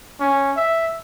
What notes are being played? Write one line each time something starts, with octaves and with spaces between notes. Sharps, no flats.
C#4
E5